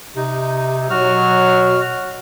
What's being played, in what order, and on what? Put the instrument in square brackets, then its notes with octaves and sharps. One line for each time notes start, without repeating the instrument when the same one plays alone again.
[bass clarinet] C3 [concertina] D#4
[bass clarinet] B2 [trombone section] F#3 [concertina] F#4 F6